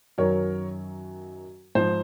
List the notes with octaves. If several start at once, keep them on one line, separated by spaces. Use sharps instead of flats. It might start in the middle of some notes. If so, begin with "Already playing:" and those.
F#2 D#3 F#3 A#4 C#5
G#2 F3 C5